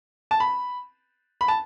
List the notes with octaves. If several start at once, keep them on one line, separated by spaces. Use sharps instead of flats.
A5
B5
B5
A5